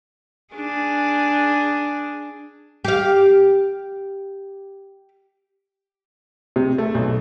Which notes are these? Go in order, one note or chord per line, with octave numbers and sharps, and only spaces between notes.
D4 G#4
G4 F5
C3
A3
B1